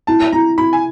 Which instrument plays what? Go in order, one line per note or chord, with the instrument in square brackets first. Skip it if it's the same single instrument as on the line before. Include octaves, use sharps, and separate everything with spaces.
[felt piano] E4 [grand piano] A5
[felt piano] E4 [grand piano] A#5
[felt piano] E4 [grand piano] B5
[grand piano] G#5